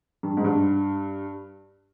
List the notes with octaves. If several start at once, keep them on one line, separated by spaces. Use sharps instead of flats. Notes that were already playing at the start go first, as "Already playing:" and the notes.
G2
G#2
G2